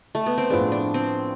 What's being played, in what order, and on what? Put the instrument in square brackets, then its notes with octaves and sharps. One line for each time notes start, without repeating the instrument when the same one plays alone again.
[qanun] A3
B3
C4
[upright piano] A2 F3 B3 F4 G#4 [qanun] D4
[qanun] D4
C4